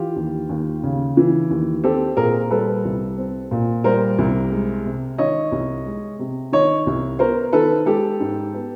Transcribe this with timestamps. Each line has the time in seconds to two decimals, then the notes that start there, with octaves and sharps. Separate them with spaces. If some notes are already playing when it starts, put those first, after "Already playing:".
Already playing: E3 F4 G4
0.16 D#2
0.49 D#2
0.84 C#3
1.17 E3
1.51 D#2
1.84 C4 G4 A4
2.17 A#2 G#4 A#4
2.50 G3 A4 B4
2.85 C2
3.18 C4
3.51 A#2
3.84 G3 A#4 C5
4.18 C2
4.52 G#3
4.86 C3
5.18 D#3 C#5 D#5
5.52 C2
5.86 G#3
6.19 C3
6.52 D#3 C#5 D#5
6.87 C2
7.19 B3 A#4 C5
7.53 D#3 A4 B4
7.86 G#3 G4 A4
8.20 G#2
8.54 B3